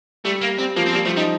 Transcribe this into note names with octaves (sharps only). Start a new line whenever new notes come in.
G3 A3
A#3
G3 C4
F3 A#3
C4
G3 A#3
F3 A3
G3 D#4